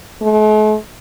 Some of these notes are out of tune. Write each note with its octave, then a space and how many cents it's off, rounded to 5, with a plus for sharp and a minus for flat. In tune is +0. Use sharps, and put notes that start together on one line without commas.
A3 -45